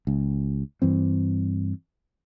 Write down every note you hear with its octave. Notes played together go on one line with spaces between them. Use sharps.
C#2
G2 E3 C4